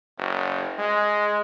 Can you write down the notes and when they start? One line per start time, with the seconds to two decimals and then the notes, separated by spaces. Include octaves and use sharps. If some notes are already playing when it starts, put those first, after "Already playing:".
0.18 F#1
0.78 G#3